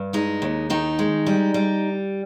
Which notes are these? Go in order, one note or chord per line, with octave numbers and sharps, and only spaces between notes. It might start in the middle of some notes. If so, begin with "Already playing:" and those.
Already playing: G2
G#3 D#4
D#2
D#3 D#4
G#3
G3
G3